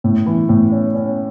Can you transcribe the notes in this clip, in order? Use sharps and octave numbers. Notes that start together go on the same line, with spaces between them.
A2
E3
A2
C#4
C#4